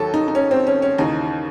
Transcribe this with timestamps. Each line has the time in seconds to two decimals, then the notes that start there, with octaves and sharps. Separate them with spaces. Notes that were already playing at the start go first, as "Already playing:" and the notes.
Already playing: D#2 D#3 F#3 A4
0.14 D#4
0.28 D#4
0.35 C#4
0.51 C4
0.67 C#4
0.82 C#4
0.98 D#2 C#3 E3 D#4